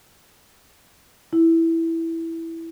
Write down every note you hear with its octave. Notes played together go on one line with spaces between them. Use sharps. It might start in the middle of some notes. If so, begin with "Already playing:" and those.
E4